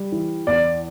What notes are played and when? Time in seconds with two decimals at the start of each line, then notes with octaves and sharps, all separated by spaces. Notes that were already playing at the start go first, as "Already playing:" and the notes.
Already playing: G3
0.12 E3
0.47 E2 D5